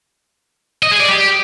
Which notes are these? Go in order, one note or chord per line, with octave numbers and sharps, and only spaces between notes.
D#5
G#4
D5
G4